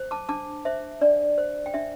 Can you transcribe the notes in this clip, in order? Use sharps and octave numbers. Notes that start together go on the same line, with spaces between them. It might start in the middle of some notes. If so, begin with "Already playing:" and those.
Already playing: C5
A5 D6
D4 A5 D6
C5 E5
D4 D5
C5
G5
D4 E5